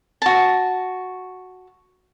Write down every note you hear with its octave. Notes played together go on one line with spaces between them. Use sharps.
F#4 A5